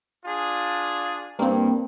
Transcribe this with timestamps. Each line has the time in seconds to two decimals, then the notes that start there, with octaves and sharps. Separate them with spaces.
0.25 D4 F4 G#4
1.39 G2 A#3 C4